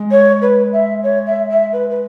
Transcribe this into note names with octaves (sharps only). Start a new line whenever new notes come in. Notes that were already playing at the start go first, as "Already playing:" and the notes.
Already playing: G#3
C#5
B4
E5
C#5
E5
E5
B4
B4